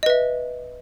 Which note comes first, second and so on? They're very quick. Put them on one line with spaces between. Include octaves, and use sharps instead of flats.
D#5 B4 E5